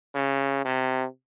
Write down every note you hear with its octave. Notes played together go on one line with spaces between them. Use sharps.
C#3
C3